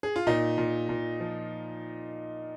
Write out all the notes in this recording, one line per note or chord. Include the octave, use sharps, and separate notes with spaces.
G#4
F4
A#2 D#4
A#2
A#2
F3